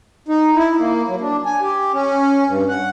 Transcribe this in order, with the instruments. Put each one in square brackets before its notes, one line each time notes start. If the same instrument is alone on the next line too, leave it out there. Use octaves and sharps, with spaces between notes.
[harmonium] D#4
E4
A#3
F#3
D4
G#5
G4
C#4
G2
F#5